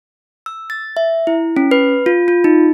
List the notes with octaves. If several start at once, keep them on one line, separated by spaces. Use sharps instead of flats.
E6
A6
E5
E4
C#4
B4
F4
F4
D#4